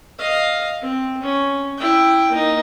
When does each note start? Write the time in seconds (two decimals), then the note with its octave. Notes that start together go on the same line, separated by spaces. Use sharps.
0.19 D#5 F5
0.82 C4
1.23 C#4
1.77 E4 G5
2.31 A#3 D#4